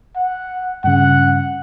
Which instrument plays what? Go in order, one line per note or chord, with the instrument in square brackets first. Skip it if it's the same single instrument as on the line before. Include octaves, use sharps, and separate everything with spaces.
[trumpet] F#5
[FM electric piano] G2 C#3 [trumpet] F#5